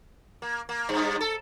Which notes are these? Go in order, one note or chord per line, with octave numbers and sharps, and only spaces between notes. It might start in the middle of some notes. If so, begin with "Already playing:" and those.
A#3
A#3
G2
A4